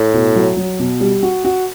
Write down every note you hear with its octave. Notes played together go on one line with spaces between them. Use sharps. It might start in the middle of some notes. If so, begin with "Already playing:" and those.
Already playing: A2
B2
F#3
F#3
B2
G3
F#4
F#4